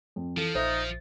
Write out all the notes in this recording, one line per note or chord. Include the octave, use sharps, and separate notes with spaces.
F2
E3 F3 A4
A#1 D#4 C5 E5